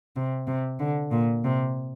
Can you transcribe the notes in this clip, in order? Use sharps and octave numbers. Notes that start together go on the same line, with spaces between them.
C3
C3
D3
A#2
C3